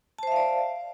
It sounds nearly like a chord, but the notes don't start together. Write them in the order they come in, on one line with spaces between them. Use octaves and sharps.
A5 C5 E5 F5 D5